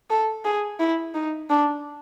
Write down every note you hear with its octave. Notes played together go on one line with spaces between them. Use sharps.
A4
G#4
E4
D#4
D4